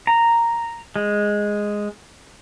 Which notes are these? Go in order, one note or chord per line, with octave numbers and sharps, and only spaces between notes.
A#5
G#3